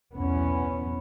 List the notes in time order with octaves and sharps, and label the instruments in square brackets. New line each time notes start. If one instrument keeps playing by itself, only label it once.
[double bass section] B1 E2 B3 C#4